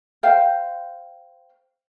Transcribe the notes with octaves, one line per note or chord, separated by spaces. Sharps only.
C5 F5 G5